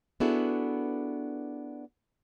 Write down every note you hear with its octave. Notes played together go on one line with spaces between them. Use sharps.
B3 D4 E4 F#4 G#4 A4